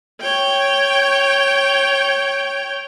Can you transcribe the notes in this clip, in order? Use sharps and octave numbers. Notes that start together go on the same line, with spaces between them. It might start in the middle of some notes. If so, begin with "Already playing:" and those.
C#5 G5